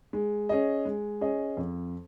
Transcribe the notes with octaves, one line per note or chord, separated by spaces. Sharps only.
G#3
C#4 G#4 D#5
G#3
C#4 G#4 D#5
F2